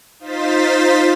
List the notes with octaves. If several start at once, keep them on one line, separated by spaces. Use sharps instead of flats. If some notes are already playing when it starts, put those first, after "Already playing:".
D#4 F4 C5 A6 B6